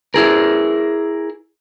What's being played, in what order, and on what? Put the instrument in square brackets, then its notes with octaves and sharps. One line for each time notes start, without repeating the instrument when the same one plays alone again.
[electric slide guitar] E4 G#4 A#4